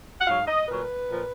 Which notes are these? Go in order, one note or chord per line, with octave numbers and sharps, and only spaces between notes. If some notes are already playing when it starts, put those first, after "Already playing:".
F#5
G#2 F#3 F5
D#5
A#2 F#3 B4
A#2 F3